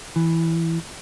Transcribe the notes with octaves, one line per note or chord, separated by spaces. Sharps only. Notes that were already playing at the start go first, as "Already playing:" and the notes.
E3